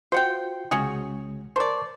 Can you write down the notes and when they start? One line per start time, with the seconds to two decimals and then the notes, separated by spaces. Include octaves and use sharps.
0.12 F4 F#4 C5 F#5 G5
0.71 C2 C#3 G#3 C#4 F#4 G#4
1.56 A#4 C5 D5 A5 C#6